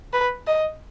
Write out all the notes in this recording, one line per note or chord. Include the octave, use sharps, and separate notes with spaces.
B4
D#5